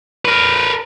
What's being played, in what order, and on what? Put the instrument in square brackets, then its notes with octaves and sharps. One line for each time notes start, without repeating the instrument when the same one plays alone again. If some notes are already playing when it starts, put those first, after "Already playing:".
[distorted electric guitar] A#4 B4